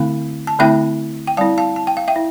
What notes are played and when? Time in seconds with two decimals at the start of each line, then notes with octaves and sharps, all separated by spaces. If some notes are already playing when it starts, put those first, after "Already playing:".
Already playing: D3 A3 C4 E4 F5
0.47 A5
0.59 D3 A3 C4 E4 E5 G5
1.27 G5
1.37 G3 C4 E4 F5 A5
1.58 F5 A5
1.76 A5
1.87 G5
1.97 F5
2.08 E5 G5
2.16 E4